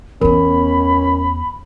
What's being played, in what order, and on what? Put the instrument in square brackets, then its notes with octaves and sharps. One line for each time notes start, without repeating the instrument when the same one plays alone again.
[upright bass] E2 B3 [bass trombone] C#4 [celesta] A#4 [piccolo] B5